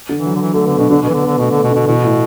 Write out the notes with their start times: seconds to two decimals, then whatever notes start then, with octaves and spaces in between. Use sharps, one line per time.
0.09 D3
0.18 E3
0.26 F#3
0.35 D3
0.42 E3
0.54 D3 A3
0.66 D3 B3
0.78 B2 D4
0.90 D3 D4
1.02 B2 B3
1.09 E3
1.14 D3
1.22 B3
1.27 D3
1.38 B2 A3
1.51 D3 A3
1.63 B2
1.71 D3
1.75 B2
1.86 B2 E3
2.03 A2